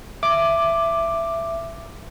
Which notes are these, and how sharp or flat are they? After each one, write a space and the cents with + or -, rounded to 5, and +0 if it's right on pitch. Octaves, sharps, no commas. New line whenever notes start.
E5 +15 D6 +5